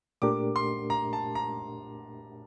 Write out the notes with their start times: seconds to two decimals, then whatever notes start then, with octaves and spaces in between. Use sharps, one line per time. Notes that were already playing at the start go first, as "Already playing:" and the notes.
0.22 A#2 A3 D4 G4 A#4 D6
0.56 C6
0.90 A#5
1.13 A5
1.35 A#5